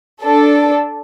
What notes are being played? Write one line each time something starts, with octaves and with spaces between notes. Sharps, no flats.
D4 A4